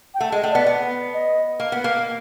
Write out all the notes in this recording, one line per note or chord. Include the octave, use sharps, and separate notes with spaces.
G5
A3 F#5
G#3 D#5
A3
B3 D5
B3
D#5
A#3
B3
A#3